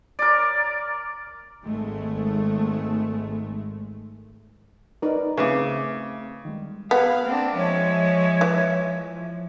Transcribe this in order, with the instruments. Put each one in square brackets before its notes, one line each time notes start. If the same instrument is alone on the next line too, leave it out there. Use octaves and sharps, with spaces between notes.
[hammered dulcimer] A#4 D5
[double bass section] G#1 G#3 A3
[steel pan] D#4 A#4 [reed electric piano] B4 D5
[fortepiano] C#3 [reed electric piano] A3 C4 [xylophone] B4 E5 D6
[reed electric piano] D#3 G3 G#3
[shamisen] B3 [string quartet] G#4 F5
[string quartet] A#3 C4 D4
[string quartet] F3 G#3 E5 [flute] C#5
[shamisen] E3
[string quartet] F3